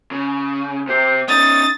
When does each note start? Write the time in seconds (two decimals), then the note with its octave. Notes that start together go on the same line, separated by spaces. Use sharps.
0.11 C#3
0.88 C3 G4 C5
1.29 C#4 D#4 D#6 A6